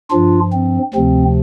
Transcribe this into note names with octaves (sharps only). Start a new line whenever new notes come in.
G2 F3 D4 F4
C4
D2 C3 F3 C4